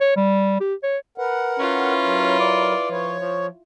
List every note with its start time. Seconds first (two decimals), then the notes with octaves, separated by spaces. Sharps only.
0.01 C#5
0.17 G3
0.61 G4
0.83 C#5
1.18 A#4 B4 F#5
1.59 C#4 E4 F4
2.04 F#3 A#4
2.40 D5
2.91 F3 C#5
3.20 F3